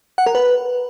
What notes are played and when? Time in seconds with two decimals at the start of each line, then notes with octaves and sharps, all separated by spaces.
0.18 F#5
0.26 A#4
0.35 B4